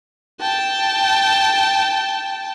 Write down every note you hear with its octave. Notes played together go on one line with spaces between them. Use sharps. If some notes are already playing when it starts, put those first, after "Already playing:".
G5 A5